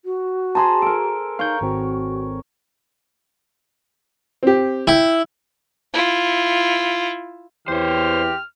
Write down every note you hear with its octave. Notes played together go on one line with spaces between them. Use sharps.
F#4
G#4 C5 A5 A#5 C6
A4 A#4 D7
D#4 A#4 C#5 F5 G6
G#1 C4 F#4
C4 G4
E4 G5
E4 F4
E2 E3 C4 G4 C5 C#5 F6